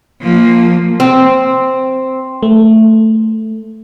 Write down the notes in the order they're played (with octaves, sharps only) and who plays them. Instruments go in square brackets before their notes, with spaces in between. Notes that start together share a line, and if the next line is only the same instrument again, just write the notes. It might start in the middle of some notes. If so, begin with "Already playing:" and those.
[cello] F3 A#3
[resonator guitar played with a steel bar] C4
[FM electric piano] A3